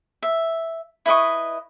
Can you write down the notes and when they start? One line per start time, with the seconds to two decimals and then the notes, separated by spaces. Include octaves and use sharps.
0.22 E5
1.06 E4 B4 D#5 C#6